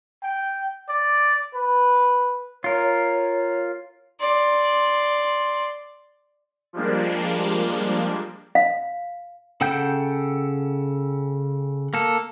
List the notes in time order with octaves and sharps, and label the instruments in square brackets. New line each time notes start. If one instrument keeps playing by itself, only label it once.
[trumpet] G5
D5
B4
[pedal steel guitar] F4 A#4 [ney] C#5
[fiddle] D5 C6
[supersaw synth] F3 G3 G#3 A#3 D4
[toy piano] F5
[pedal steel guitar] C#3 A4 F#5 G5 G6
A#3 A4